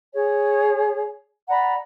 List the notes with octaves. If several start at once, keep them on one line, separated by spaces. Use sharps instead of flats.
G#4 C#5
D5 F#5 A#5 B5